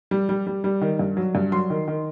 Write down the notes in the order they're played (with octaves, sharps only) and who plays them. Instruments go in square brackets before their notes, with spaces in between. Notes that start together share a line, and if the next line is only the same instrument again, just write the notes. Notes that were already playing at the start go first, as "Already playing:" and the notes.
[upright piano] G3
G3
G3
G3
D#3
G2
F#3
G2
F#3 C6
D#3
D#3